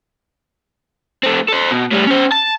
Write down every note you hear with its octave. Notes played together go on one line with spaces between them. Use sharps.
A3 C4
A4 C5
B2
A2 G3
C#4 C5
A5